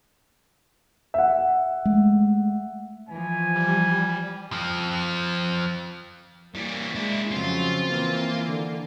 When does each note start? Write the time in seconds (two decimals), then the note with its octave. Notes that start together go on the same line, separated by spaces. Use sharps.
1.14 E5 F#5
1.85 G#3 A3
3.09 E3 F3 G#5
3.55 G3
4.52 F2 F3
6.55 E3 G3 A#3
6.95 G#3 D4 E4
7.32 F2 C#3 F#3 C4 F4
7.88 E3 A#3
8.46 D3